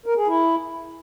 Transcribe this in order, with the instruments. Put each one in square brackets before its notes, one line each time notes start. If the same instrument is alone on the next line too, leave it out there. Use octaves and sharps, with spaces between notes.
[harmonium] A#4
G#4
E4